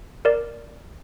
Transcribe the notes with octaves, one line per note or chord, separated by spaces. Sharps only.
A#4 D5